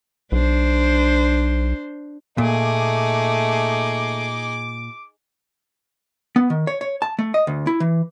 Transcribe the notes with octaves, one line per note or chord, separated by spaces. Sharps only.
B1 D4 C5
A#2 A3 D#4 G#4 D6
B3
D#3
C#5
C#5
A5
A3
D#5
D2
E4
E3